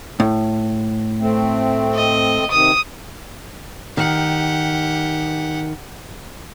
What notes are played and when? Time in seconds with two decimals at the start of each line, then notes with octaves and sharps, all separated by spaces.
0.20 A2
1.20 A3 C4
1.94 D#5
2.51 C3 D#3 D#6
3.97 D#3 G4 F#5